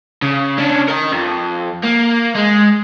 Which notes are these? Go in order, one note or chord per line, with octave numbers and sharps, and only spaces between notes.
C#3
C#4 D4
A#4 D#5
F2
A#3
G#3